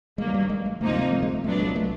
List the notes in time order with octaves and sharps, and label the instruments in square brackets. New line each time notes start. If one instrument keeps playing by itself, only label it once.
[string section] G2 D#3 F#3 A#3 [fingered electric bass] G#3
[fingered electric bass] G3
G#3
G#3
[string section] D2 C3 F3 A#3 D#4 [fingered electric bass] A3
[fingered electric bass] G#3
A3
G#3
A3
[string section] C2 A#2 F#3 B3 D4 [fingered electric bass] A3
[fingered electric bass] G#3
A3